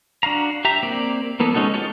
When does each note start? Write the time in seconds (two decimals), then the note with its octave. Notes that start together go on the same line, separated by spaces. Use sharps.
0.23 D4 F#4 F5 A#5
0.65 G4 E5 A#5
0.83 A#3 C4 D5
1.40 E3 A#3 B3 A4
1.54 G#3 C#4 D#4 F#4 A4
1.74 D#4 F4 G4 A4 C#5